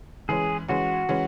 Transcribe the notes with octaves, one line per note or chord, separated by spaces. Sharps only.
E3 G#3 C#4 G#4
E3 G#3 C#4 F#4
E3 G#3 C#4